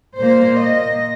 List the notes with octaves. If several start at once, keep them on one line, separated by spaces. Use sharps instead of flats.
A#2 A#3 C5
D#5